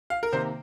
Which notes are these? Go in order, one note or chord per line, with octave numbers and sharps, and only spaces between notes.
F5
A#4
C3 D#3 A#3 C5